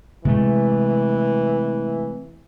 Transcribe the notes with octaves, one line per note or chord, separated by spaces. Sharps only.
C3 E3 G#3 A3